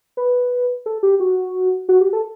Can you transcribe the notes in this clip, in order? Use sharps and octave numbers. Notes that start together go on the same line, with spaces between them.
B4
A4
G4
F#4
F#4
G4
A4